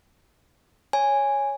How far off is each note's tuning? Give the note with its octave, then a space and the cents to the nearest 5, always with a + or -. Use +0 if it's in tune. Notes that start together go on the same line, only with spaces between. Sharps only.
C#5 +0 G#5 -5